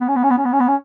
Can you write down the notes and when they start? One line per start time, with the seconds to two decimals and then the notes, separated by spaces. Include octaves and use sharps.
0.01 B3
0.08 C#4
0.16 B3
0.23 C#4
0.30 B3
0.38 C#4
0.45 B3
0.53 C#4
0.60 B3
0.68 C#4